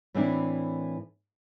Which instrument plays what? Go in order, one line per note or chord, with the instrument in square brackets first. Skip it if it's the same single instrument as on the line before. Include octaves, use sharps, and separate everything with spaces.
[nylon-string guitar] A2 E3 A#3 C4 D4 E4